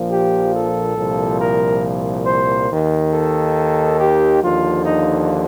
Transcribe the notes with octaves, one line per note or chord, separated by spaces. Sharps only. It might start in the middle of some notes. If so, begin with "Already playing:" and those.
Already playing: A#1 A#2 F3
G4
A4
C2 A#2 F3
A#4
C5
D#2 D#3
A4
G4
D#2 D3 F3 F4
D#4